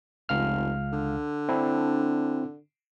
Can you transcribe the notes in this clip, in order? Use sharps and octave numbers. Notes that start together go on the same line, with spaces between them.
F1 C#2 F5 F6
D3
C4 D4 E4